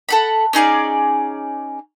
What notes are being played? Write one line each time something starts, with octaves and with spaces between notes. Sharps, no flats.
A4 F#5 B5
C#4 D#4 G#4 D5